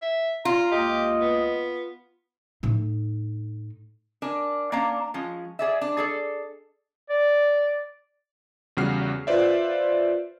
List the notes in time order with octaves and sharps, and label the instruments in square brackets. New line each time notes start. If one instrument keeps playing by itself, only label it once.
[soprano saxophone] E5
[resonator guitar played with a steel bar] F4 [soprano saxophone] A#5
[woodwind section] C#2 A#3 D#5 [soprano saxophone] G4
[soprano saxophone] B3
[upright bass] A2 D#4
[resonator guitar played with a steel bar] D4 A#4 G#5
A#3 C#4 D4 D5 F5 A#5
F3 G#3 C#4
G#4 D5 E5
D4
G#4 A4 D5
[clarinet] D5
[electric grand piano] E2 C#3 G3 F#4 F6 C7
F4 B4 C5 D5 E5